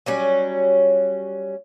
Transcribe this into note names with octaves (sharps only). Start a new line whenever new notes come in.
F#3 G3 C#4